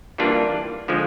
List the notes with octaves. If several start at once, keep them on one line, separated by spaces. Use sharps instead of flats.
E3 G3 A#3 D4 F4
D3 F3 G#3